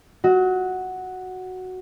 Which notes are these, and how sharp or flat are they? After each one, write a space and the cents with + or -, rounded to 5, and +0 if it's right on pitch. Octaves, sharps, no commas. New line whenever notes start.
F#4 +0 D#5 +45